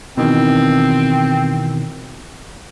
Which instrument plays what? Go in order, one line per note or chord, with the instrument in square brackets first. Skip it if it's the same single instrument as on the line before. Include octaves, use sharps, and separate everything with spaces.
[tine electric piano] B2 D#3 E3 [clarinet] C4